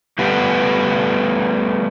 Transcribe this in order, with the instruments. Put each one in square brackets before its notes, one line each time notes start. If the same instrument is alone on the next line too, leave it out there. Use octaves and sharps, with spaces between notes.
[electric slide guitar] G3 A3 B3 G4 B4 F#5